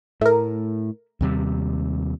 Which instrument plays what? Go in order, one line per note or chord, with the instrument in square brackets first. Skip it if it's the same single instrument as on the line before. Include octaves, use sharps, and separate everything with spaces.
[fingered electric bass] A2 [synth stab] A3 A#4
[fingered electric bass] D#2 C3 G3